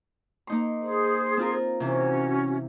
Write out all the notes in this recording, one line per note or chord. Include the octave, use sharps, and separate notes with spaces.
A#3 D#4 C6
G#4 C5
C4 F4 A#4
C3 E3 C#4 F#4